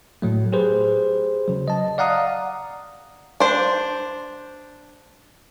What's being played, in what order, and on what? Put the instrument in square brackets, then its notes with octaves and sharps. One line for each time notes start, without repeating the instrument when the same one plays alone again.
[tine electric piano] A2 F#3 A3
G4 G#4 B4 C5
C#3 F#3
D#5 A5
D5 F5 F#5 A#5 D#6
[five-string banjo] D4 C5